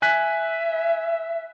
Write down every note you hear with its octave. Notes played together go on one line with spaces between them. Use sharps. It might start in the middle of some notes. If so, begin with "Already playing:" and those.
E5 G#5 F#6 B6